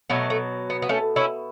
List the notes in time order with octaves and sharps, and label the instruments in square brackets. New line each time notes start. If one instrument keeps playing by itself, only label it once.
[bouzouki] B2 F#3 A3 B3
A3
B3
B3
A3 C#4
C#4 E4